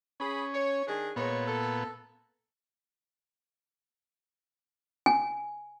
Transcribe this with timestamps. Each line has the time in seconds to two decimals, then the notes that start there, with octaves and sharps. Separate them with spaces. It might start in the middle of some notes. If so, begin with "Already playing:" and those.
0.20 C#4 G#4 B5
0.54 C#5
0.87 D#3 D4 G#4
1.16 A#2 G#3 B3 C#5
1.47 A4
5.06 G#5